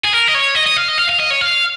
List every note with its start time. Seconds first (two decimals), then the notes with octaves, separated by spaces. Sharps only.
0.04 G#4
0.13 A#4
0.28 D#5
0.34 C#5
0.55 D#5
0.66 D#5
0.76 F5
0.88 D#5
0.98 F5
1.09 F5
1.20 D#5
1.30 C#5
1.41 F5